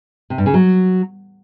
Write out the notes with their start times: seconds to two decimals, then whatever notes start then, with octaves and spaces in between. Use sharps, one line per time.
0.30 C3
0.38 G2
0.46 C#3
0.54 F#3